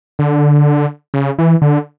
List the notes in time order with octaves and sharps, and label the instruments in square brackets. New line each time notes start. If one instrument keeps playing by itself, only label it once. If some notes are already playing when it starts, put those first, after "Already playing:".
[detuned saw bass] D3
C#3
E3
D3